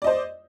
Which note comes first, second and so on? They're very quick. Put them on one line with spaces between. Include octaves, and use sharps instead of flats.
D5 D#5 C5